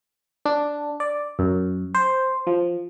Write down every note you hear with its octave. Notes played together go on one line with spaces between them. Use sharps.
D4
D5
F#2
C5
F3